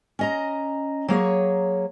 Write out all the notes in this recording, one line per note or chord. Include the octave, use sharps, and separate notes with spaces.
C#4 D#5 A#5
F#3 A#3 G#4 C#5